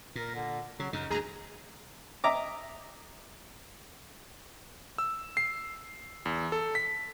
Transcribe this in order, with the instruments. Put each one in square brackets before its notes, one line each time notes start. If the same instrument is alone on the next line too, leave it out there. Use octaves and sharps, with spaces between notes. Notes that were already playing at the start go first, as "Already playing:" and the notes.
[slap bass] A#2 [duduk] A#4
[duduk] D3
[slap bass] C#3 [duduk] F#3
[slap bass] F#2 C#3 [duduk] D#4
[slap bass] D2 G2 [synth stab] G#4 A#5
[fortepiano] D#5 E5 A#5 D6
[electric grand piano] E6
C7
E2
A4
B6